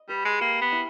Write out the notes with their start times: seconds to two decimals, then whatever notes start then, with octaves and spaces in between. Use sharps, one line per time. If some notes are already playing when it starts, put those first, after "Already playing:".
Already playing: D#5
0.09 G3 B4
0.25 G#3
0.40 A#3 G4
0.61 B3
0.72 E4